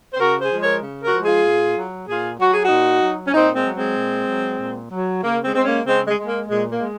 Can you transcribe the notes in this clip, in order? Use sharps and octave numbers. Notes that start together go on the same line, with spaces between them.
C5
C#3 F#4 A#4
G#4 C5
F3 G#3
A#4 C#5
C#3
F#4 A#4
F3 G#3
F4 G#4
A#2
F#3
A#2 F4 G#4
F#3 F#4
G#4
D#4 F#4
A#2
F#3
C#4
A#2 C4 D#4
G#3 C4
F#3
G#3 C4
A#2
F#3
A#2
F#3
C#3 A#3
G#3 C4
G#3 C4
A#3 C#4
C#3 G#3 C4
G#3
G#3
A#3
A#2 G#3
A#3
G#3